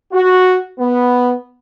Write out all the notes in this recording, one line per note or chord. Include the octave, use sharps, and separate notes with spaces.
F#4
B3